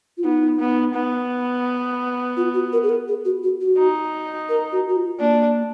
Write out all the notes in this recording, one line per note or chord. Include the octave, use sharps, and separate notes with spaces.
F4
B3 D#4
B3
B3
F4
F#4
A#4
G#4
A#4
G#4
F#4
F#4
F#4
D#4
A#4
F#4
F#4
F4
A#3 D4